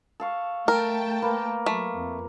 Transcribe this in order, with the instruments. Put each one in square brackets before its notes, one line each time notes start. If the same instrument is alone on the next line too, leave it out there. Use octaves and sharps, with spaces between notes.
[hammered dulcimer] A4 F5 C#6
[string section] A3 G5 A5 [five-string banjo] A#4
[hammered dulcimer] A#3 B4
[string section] F#3 [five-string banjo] A3
[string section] F2